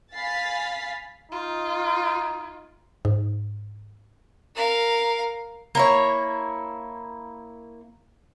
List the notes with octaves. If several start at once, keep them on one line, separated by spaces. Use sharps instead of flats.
F5 G#5 B5 A6 B6 C7
D#4 F4
G#2
A#4 F5
A#3 E4 C#5